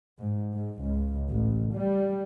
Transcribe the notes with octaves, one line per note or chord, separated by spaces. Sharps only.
G#2
G#2
C#2
A1
G3